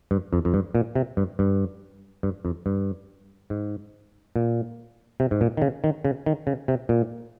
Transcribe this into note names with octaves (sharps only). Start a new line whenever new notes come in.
G2
F2
F2
G2
A#2
C3
G2
G2
G2
F2
G2
G#2
A#2
C3
G#2
A#2
D#3
C#3
D#3
C#3
D#3
C#3
C3
A#2